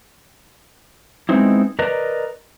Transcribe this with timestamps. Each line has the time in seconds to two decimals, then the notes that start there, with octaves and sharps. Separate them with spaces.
1.29 G#3 B3 C4 D#4 E4
1.79 A#4 B4 D5 D#5 A#5